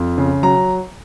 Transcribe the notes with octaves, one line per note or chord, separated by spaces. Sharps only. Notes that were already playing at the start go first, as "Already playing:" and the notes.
Already playing: F2
C#3
F#3 A#5